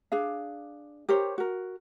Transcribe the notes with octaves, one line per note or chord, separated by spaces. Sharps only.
D4 G#4 F5
G4 A#4 C5 C#5
F#4 A#4